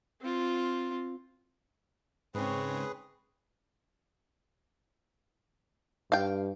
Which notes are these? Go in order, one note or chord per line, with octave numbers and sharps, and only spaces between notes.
C4 F4
G#2 C#3 C4 G#4 B4 C#5
G2 F5 G5